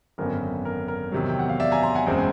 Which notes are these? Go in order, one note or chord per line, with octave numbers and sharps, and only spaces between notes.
G#1 F#2 D3 F#3 B3 A#4
A#4
A#4
E2 C3 D#3 F#3
G5
F#5
F5
D5 E5
G#5 A#5
A#5 C6
F#5 G#5
F#1 E2 B2 G#3 C4